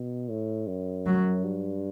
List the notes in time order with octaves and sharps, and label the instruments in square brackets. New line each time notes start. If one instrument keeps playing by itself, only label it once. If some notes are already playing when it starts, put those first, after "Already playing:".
Already playing: [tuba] B2
A2
F#2
[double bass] F#3
[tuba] G2